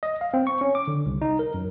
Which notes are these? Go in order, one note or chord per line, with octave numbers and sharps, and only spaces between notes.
D#5
F5
C4
C#6
C#4
D6
D3
C2
D#4
A#4
F#2